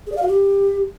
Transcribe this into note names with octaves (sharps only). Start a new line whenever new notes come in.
G#4
D5
F5
F#4
G4